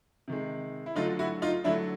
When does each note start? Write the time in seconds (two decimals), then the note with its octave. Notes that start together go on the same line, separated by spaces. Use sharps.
0.28 C3 D#3 G#3
0.86 E4
0.96 D3 F#3 A3 D#4 F4
1.19 E4 F#4
1.42 D#4 F4
1.64 D3 F#3 A3 D4 E4